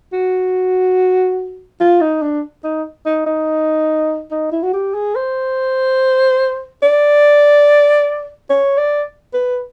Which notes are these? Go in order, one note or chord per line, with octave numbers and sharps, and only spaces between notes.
F#4
F4
D#4
D4
D#4
D#4
D#4
D#4
E4
F#4
G4
G#4
C5
D5
C#5
D5
B4